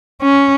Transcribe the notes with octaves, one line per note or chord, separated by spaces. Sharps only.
C#4